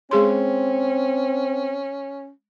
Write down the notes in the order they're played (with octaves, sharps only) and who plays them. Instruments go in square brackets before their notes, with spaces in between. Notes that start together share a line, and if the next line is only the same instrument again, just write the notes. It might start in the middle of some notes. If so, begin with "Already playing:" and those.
[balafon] G#3 G#4 C6 [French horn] C4 [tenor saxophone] C#4